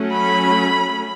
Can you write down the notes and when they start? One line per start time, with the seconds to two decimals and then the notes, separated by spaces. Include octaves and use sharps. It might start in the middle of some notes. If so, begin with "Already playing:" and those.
Already playing: F#3 A3 C#4
0.14 B5